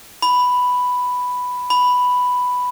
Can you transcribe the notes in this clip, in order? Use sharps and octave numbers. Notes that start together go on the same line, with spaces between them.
B5
B5